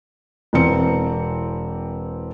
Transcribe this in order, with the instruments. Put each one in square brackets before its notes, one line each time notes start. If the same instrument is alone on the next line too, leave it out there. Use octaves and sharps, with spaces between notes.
[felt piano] E1 E3 C4 C#7